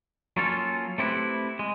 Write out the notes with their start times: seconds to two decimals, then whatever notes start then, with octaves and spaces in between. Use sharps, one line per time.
0.37 F#3 A#3 C#4 F4 A4
0.98 A3 C4 E4 G4 B4
1.59 G#3